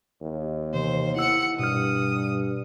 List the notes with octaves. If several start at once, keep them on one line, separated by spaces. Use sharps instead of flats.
D#2
C3 E3 B3 C5
E4 F#5 E6 C#7
G2 B2 D#6 F6